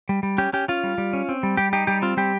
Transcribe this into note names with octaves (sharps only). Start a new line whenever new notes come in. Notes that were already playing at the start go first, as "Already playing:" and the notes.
G3
G3
C#4 G4
C#4 G4
C#4 F4
G3
G3
C#4
C4
G3
G3 G4
D#4 G4
G3 G4
C4 F4
G3 G4